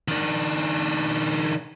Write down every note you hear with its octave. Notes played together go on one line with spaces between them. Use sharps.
D#3 D4